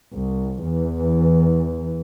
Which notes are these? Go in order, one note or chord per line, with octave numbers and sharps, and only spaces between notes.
C2
E2 E3